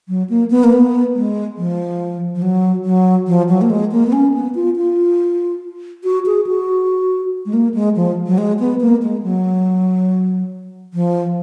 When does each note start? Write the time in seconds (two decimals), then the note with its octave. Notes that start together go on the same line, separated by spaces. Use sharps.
0.08 F#3
0.30 A#3
0.50 B3
0.64 A#3
0.73 B3
1.15 G#3
1.58 F3
2.35 F3
2.42 F#3
2.85 F#3
3.28 F3
3.49 F#3
3.61 A#3
3.70 G#3
3.92 A#3
4.07 B3
4.13 C#4
4.34 B3
4.55 F4
4.77 F4
6.04 F#4
6.26 G#4
6.47 F#4
7.46 G#3
7.53 A#3
7.74 G#3
7.96 F3
8.27 F#3
8.38 G#3
8.60 B3
8.81 A#3
9.02 G#3
9.23 F#3
10.94 F3